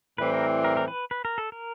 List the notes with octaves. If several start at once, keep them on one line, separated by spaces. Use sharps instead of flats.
A2 E3 G3 C4 E4 B4
A#4
A#4
A#4
B4
B4
A#4
A4
A#4